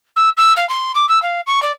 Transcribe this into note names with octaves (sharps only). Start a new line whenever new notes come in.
E6
E6
F5
C6
D6
E6
F5
C#6
D5